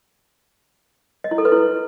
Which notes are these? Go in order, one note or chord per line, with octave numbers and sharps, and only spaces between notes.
D#5
E4
A4
B4
E4